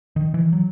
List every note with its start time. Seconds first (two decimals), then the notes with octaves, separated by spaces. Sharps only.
0.16 D#3
0.34 E3
0.53 F#3